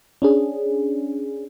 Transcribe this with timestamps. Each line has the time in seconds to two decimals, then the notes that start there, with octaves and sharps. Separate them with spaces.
0.22 C#4 D4 G#4